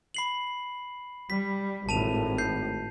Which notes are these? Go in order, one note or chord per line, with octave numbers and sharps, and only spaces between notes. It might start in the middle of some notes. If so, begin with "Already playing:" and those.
B5 C7 F#7
G3 B6
G#1 A2 A5 D#7 F7
G6 C7